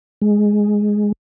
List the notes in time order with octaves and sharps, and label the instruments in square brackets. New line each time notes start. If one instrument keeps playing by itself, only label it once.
[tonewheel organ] G#3